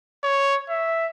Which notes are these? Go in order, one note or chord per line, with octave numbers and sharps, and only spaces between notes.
C#5
E5